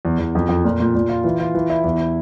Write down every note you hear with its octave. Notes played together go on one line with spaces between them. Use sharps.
E2
E2
F2
F2
A#2
A#2
A#2
F4
E3
F4
E3
E4
E2